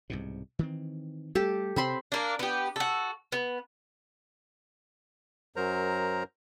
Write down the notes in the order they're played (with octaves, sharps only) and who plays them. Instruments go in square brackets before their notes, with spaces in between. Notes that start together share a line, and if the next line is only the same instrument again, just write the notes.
[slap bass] C2 G#2 B2
D#3 E3 C4
[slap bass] G3 A3 [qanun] G4 A4
[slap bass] C3 [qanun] C4 B5 C6
[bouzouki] A#3 D4
B3 G4
F#4 A4
B3
[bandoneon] F#2 F#3 A#4 C5 A#5